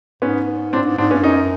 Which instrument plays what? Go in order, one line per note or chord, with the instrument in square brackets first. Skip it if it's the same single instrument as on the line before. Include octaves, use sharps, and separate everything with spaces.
[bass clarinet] G#2 [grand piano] B3 C#4
[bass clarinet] A2 [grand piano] C4 D4
[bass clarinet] G2
G#2
[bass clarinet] G#2 [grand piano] C4 D4
[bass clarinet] G2 [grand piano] B3 C#4
[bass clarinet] F#2 [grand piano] C#4 D#4